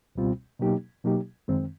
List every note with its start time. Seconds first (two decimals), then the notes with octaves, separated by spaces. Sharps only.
0.15 C#2 B2 G3 C4 F4
0.60 B2 F#3 A#3 D#4 G4
1.04 B2 F#3 A#3 D#4 G4
1.48 F#2 D#3 G#3 C4